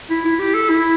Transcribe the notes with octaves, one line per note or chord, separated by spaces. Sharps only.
E4
E4
G4
A4
E4